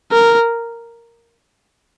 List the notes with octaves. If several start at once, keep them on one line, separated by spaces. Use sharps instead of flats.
A#4